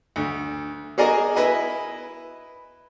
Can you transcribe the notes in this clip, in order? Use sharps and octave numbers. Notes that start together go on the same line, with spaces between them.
D2
F#4 G#4 A#4 D5 D#5 G#5
E4 B4 D#5 G#5